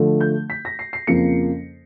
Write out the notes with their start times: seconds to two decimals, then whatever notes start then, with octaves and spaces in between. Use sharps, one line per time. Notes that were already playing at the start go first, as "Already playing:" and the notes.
Already playing: D3 F3 A3
0.21 G6
0.50 B6
0.65 A#6
0.79 C7
0.93 C7
1.07 F2 C#3 F3 A#3 C#7